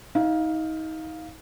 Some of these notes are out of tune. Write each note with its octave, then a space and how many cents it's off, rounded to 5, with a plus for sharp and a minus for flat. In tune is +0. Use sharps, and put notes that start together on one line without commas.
D#4 +30 F5 +5